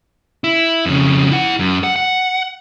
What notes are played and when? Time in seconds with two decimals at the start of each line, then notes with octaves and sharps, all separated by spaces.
0.44 E4
0.86 F2 C#3
1.31 E4 F#5
1.59 F#2
1.83 F#5
1.96 F#5